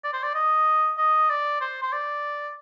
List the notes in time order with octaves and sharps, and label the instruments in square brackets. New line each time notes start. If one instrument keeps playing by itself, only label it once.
[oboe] D5
C5
D5
D#5
D#5
D5
C5
C5
D5